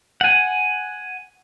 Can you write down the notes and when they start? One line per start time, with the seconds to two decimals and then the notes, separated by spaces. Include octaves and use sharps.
0.21 F#5 G#5